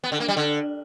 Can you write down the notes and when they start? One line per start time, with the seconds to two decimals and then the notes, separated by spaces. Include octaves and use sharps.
0.04 B3
0.12 D3
0.20 A#3
0.28 G3
0.37 D3